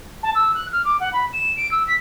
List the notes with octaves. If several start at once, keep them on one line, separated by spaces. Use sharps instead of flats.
A5
E6
F#6
F6
D6
F#5
B5
E7
D7
E6
B6